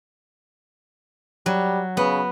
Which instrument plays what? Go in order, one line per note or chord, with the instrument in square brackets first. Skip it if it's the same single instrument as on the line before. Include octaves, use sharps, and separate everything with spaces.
[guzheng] F#3 [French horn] G3
[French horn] C#3 [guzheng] B3